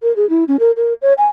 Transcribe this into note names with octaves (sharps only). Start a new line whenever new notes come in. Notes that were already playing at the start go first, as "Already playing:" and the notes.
A#4
G#4
E4
C#4
A#4
A#4
C#5
G#5